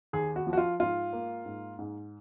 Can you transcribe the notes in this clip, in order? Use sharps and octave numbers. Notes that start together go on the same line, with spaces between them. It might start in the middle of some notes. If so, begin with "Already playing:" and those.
D#2 G#4
F#4
F3
F#4
F4
G#2 F4
A#3
G#2
G#2